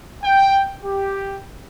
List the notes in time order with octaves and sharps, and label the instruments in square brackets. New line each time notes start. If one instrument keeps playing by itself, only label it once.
[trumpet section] G5
G4